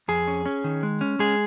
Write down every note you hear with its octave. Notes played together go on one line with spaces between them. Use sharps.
F2 G#4
C#4
C#4
D#3
G#3
C#4
G#3 G#4